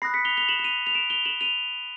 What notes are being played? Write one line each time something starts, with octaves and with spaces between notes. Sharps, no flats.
B5 D#6 F#6 A#6 C7
B6 C#7
F7 G7
F7 G7
E7 F#7
E7
D#7 F7
F7
D7 E7
F7 G7
E7 F#7
D#7 F7